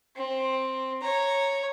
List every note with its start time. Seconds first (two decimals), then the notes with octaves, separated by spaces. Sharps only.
0.16 C4
1.02 C#5 A#5